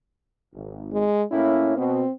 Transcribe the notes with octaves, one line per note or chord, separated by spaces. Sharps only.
G#1
G#3
A2 A#3 C#4 E4
B2 C4